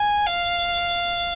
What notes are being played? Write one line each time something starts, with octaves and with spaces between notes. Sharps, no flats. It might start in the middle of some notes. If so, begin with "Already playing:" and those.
Already playing: G#5
F5